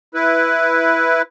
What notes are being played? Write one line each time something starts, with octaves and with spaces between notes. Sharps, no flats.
E4 B4